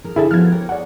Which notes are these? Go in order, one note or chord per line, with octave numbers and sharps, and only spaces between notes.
G#4 A#4
D3 E4 G#4 A4
F3 B3 F#4 F6 G#6
G4 A#4 C#5
G#4 C#5 D5 F#5